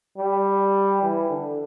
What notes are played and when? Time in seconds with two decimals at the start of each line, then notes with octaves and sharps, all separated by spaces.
0.18 G3
1.02 E3
1.30 D3